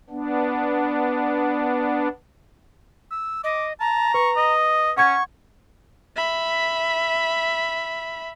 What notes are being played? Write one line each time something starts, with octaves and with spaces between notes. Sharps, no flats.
B3 D4
E6
D#5 D6
A5 A#5
B4 C#6
D#5
C#4 F#5 C#6 G#6
E5 B5